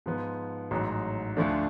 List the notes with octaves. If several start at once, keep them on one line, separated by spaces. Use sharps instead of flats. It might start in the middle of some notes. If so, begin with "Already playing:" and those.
G#2 F3 B3
A1 G#2 F#3
D2 D3 F3 A3 D4